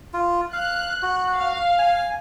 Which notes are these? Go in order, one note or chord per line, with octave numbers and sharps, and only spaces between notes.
F4
F5 F#6
F#4
F5
G#5